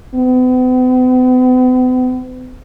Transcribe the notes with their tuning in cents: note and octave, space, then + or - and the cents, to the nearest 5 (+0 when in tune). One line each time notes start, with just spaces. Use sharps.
B3 +45